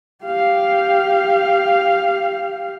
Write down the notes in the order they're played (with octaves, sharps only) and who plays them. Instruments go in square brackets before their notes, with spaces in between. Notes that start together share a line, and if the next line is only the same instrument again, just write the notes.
[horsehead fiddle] G4 F5